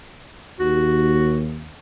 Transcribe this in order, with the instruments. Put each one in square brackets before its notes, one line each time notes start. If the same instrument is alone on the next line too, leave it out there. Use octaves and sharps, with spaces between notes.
[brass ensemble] D#2 [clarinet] F#4